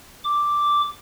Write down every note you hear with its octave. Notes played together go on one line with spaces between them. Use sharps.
D6